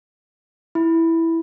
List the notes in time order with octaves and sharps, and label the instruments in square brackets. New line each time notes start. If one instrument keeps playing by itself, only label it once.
[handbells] E4